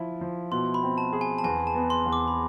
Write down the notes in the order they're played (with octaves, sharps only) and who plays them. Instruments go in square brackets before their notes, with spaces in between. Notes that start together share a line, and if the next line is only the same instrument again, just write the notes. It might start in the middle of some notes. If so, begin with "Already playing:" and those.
Already playing: [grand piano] F3 E4 F4
F3
[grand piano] B2 [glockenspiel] C6
[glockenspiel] B5
[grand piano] C4
[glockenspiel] A5
[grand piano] G#4
[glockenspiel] G#5
A5
[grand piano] E2 [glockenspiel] G#5
[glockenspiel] A5
[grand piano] B3
[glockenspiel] C6
[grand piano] E2
[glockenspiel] D6
B5